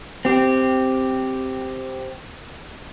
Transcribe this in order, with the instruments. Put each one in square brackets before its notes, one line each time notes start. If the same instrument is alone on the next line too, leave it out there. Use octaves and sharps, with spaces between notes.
[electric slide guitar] C4 G4